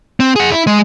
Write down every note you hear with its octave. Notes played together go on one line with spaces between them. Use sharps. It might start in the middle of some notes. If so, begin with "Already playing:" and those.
C4
G#4 F#5
E4
G#3